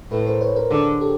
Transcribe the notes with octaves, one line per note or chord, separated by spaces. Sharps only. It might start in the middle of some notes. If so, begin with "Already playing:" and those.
A2 A4 B4
A#4 C5
B4 C#5
A#4 C5
D3 G#4 A#4
G4 A4